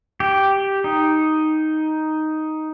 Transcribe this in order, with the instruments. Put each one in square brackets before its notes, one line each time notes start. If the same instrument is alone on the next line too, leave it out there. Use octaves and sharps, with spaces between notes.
[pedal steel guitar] G4
D#4